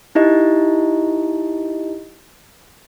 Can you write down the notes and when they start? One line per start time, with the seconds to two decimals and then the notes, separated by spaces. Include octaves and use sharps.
0.15 D#4 E4 G4 D#5